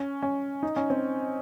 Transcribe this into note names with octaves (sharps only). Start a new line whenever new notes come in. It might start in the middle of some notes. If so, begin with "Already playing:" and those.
Already playing: C#4
C#4
D#4
C#4
C4